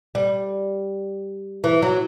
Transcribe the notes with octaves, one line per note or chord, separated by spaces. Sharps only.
G3
E3
F#3